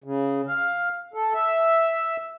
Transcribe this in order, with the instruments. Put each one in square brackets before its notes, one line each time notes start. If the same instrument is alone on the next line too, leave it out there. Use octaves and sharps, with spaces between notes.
[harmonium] C#3
F5
A4
E5